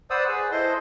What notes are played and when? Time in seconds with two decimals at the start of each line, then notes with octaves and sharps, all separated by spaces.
0.10 B4 C5 D5 F#5 D#6 E6
0.28 G#4 B4
0.52 E4 A4 C5 D#5 C6